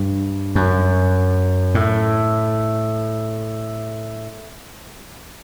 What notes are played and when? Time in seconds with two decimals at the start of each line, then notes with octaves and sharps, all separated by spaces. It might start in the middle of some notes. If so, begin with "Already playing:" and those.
Already playing: G2
0.55 F#2
1.75 A2